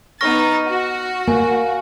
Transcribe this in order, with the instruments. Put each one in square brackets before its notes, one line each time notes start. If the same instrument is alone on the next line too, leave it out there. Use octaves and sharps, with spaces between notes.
[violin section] B3 D#4 A6 [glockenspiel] C#6 F6 A#6
[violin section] F#4
[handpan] A#3 [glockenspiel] G#5